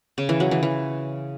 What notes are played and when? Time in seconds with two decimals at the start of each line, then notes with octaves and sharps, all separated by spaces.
0.18 C#3
0.29 E3
0.40 F#3
0.51 E3
0.63 E3